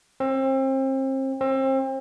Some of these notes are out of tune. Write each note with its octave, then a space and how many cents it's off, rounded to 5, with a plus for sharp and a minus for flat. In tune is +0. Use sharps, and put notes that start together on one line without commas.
C4 +35
C4 +35